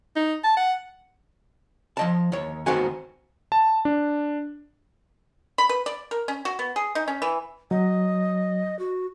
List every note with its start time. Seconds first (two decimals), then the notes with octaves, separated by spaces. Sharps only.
0.16 D#4
0.44 A5
0.57 F#5
1.97 F3 D#5 A5
2.32 D#2 C#5
2.66 D#2 D#3 B3 C4 F#4 G#5
3.52 A5
3.85 D4
5.58 B5
5.69 B4
5.86 D5
6.11 A#4
6.28 C#4
6.45 F#4
6.59 B3
6.76 G#4
6.95 D#4
7.08 C#4
7.22 E3
7.71 F#3 D#5
8.79 F#4